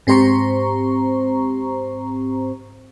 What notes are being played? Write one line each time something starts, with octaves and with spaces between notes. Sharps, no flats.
G#2 C4 G4 C5 A#5 C#6